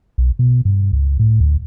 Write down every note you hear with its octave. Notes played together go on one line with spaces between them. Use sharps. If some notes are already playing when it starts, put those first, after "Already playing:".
B1
B2
G2
C#2
A2
D2